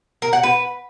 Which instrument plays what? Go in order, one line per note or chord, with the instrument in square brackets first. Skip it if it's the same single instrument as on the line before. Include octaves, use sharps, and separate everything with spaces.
[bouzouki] A#4
F#5
B4